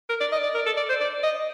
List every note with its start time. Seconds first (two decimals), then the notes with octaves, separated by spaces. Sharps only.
0.09 A#4
0.21 D5
0.32 D#5
0.43 D5
0.55 A#4
0.66 A4
0.77 D5
0.89 C5
1.00 D5
1.23 D#5